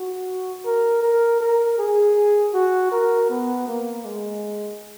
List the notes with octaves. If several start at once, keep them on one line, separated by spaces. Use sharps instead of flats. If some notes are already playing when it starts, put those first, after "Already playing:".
Already playing: F#4
A#4
A#4
A#4
G#4
F#4
A#4
B3
A#3
G#3